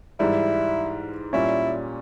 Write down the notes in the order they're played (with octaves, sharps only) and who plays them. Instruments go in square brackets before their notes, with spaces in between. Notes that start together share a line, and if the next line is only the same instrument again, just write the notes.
[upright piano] G#2 E3 G3 [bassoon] E4
[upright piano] A#2 G3 C#4 [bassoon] E4